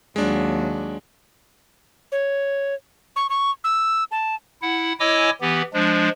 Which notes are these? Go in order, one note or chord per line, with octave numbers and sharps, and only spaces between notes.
D#2 F#3 G#3 D4
C#5
C#6
C#6
E6
A5
E4 F#5
E4 C#5 D#5 G#5 D6 E6
E3 B3 G4
F3 G#3 D4